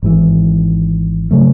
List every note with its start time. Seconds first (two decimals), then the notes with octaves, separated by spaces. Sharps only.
0.03 G#1 G#2 E3
1.31 C#3 F#3 A3